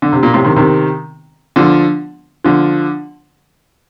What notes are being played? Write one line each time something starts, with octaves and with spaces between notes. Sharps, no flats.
D3
C3
A#2
A2 C3
C3 D#3
C3 D#3
D3 F3
D3 F3